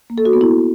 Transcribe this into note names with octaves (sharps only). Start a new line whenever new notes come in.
A#3
A4
F#4
B3
E4